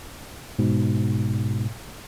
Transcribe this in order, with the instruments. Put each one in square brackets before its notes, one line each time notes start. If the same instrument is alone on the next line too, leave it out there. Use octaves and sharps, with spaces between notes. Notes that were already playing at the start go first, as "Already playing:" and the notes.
[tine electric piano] G#2 B2